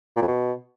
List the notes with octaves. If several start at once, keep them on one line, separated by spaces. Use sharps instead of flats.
A#2
F2
B2